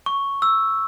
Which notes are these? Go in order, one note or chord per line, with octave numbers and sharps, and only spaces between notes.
C#6
E6